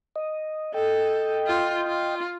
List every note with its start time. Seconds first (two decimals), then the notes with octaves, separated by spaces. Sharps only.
0.16 D#5
0.74 A4 D#5 G5
1.47 F4
1.87 F4